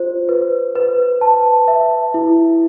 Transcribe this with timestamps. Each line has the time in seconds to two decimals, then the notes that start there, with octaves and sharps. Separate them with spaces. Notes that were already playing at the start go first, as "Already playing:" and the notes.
Already playing: F4 C5
0.29 B4
0.75 B4
1.21 A5
1.68 E5
2.14 E4